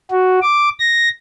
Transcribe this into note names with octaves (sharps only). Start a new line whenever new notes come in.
F#4
D6
A#6